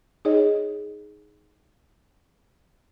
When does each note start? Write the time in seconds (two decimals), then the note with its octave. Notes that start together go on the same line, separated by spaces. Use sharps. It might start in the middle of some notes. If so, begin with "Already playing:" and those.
0.25 D#4 G#4 C#5 D#5